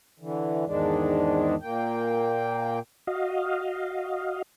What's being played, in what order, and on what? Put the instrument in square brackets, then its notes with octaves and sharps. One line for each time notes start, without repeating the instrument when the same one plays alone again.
[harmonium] D3 E3
E2 G#2 D#3 G#3 D4
A#2 A#3 G5
[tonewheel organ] F#4 D#5 F5